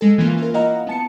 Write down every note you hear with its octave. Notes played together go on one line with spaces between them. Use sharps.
G#3 A4
E3 A#3 C#4 F4
F4 A#4
A#3 E4 D#5 F5 F#5 A#5
B3 A5 C#7